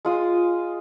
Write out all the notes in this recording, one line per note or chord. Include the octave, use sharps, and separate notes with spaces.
G#3 F4 D#6